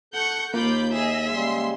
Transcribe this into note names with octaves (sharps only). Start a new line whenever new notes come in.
A4 F#5 C#6 G6
D#2 A#3 F4 B5 D6 G6
G#4 D#5 E5
C#3 G3 G#3 C6